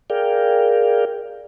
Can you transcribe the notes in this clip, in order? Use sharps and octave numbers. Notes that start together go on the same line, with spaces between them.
G#4 A#4 D5 F5 G5